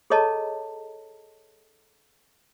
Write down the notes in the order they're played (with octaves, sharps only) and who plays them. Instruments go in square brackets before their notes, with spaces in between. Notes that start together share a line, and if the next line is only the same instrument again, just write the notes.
[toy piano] G#4 A4 C#5 D#5 A5 A#5